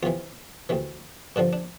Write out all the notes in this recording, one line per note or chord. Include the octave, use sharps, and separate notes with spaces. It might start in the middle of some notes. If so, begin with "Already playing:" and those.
E2 C3 E3 F4
D2 C3 E3
G2 D3 F3 D4
D4